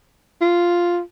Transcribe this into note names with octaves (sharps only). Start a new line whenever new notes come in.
F4